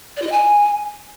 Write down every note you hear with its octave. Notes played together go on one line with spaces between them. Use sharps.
D5
F4
D#5
G#5